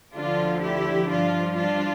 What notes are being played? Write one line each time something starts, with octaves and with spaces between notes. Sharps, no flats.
D2 D3 F3 D4 F4
E4 G4
G2 F3 D4 F4
D4 F4